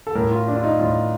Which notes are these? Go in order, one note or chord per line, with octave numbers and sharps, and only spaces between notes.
A4
A2 A#4
F4
D4
F4
D#4
A2 F4